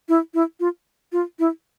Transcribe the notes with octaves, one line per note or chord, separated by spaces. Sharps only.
E4
E4
F4
F4
E4